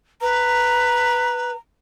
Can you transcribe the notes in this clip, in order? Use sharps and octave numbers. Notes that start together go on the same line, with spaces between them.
B4 A#5